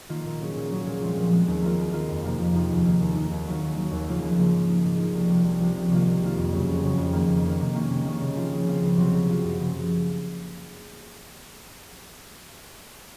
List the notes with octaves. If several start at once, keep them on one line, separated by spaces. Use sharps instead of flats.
D#3 A#3 F4
A#2
F#3 C#4 G#4
A#2
F#3 C#4 G#4
A#2
F3 G#3 C4
A#2
F3 G#3 C4
D#2
D#3 A#3 F4 A#4
D#2
D#3 A#3 F4 A#4
F2
C3 F3 A#3 D#4
F2
C3 F3 A#3 D#4
D#2
D#3 A#3 D#4
D#2
D#3 A#3 D#4
D#2
D#3 F#3
D#2
D#3 F#3
D#2
C#3 F3 A#3 F4
D#2
C#3 F3 A#3 F4
G#2
F3 A#3 D#4
G#2
F3 A#3 D#4
C2
C3 F3
C2
C3 F3
C2
C3 D#3 A#3 F4
C2
C3 D#3 A#3 F4
F2
C#3 F#3 C#4
F2
C#3 F#3 C#4
F2
D#3 A#3
F2
D#3 A#3
C3
D#3 A#3 C#4
C3
D#3 A#3 C#4
C#3
F3 C4 F4
C#3
F3 C4 F4
C#2
C3 F#3 C4 F4
C#2
C3 F#3 C4 F4
F#2
C#3 F3
F#2